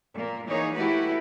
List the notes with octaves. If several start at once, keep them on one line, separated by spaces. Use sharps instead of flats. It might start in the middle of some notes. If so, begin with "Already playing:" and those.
A#2 A#3
E3 A#3 D#4 G#4 C#5
A3 E4 F#4 G4 B4